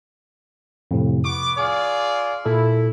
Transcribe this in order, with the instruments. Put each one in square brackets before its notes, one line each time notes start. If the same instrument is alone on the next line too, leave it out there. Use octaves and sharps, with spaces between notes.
[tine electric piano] F2 A2 C3
[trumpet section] B3 D6 [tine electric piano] C#6
[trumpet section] F4 G#4 D5
[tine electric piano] A#2 A4 [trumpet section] E4